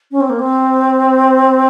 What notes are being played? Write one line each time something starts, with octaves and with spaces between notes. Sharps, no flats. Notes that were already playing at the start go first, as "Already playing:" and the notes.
C#4
C4
A#3
C4